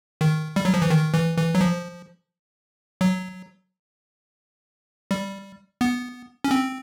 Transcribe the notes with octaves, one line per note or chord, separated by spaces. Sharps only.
D#3
G3
F#3
F3
E3
D#3
E3
E3
F#3
F3
F#3
G3
B3
C#4
C4